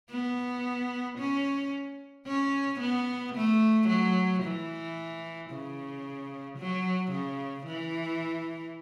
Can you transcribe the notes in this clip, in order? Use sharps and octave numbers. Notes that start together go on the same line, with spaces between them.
B3
C#4
C#4
B3
A3
F#3
E3
C#3
F#3
C#3
E3